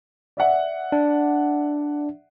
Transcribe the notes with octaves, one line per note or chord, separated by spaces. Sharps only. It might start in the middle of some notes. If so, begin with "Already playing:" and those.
D5 E5 F#5
D4